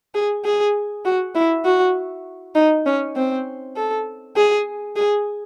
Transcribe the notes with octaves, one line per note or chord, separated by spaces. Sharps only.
G#4
G#4
F#4
E4
F#4
D#4
C#4
C4
A4
G#4
G#4